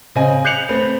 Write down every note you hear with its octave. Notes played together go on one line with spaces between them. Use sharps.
C#3 C4 D#5 G#5
F#6 G6 C7 C#7 F7 F#7
A3 C4 B4